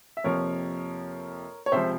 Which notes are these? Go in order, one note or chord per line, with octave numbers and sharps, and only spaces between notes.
E5
F2 C3 F3 A#3 A#4 C#5
C#5
C#2 C3 F3 C5 E5